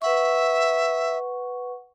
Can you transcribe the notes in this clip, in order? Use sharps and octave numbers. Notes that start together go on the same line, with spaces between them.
B4 E5 F#5 C#6